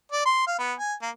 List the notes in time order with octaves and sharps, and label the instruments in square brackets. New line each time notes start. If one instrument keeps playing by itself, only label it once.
[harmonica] D5
C6
F5
B3
G#5
A#3